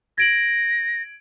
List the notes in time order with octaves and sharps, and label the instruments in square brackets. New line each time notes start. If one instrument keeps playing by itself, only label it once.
[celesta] G#6 D7 F#7 [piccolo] A#6